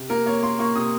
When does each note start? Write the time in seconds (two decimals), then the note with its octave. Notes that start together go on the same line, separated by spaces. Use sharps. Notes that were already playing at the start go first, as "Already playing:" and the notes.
Already playing: C3
0.10 A#3 A#4
0.26 A#3 C#5
0.43 A#3 C6
0.59 A#3 C#6
0.76 C3 D#6